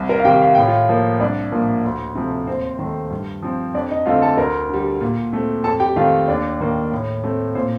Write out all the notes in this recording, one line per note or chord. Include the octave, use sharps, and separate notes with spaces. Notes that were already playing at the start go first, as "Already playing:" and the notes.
Already playing: C2
A#4 A#5
F5
C3 D#3 G4 G5
F5
A2 G5
F4 F5
F3 A#3
C2 D4 D5
A#2 F3 A#3
D2
C3 F3 A3
D#2 C4 C5
D#3 A3
G2
F3 C4
F2 D4 D5
D#4 D#5
D3 A3 C4 F4 F5
A4 A5
D2 A#4 A#5
D3 G3
A#2
A3 C4
F2 A4 A5
G4 G5
D#3 A3 C4 F4 F5
D#2 D4 D5
D#3 A#3
A2
A3 C4
A#2 C4 C5